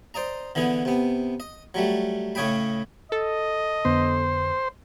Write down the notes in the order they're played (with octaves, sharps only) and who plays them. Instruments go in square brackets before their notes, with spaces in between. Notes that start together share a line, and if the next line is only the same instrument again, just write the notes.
[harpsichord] C5 D5 D#5 A#5
D3 E3 B3 G#4
C3 B3
D#5
F#3 G3 A3
A2 C#3 C#5 D#5 G5 B5
[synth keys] A4 [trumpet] D#5
[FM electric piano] F2 D3 B3 [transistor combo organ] C5